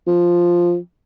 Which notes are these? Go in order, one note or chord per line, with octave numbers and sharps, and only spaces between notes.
F3